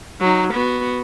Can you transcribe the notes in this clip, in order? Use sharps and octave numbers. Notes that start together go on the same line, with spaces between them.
F#3 D#4
B3 F#4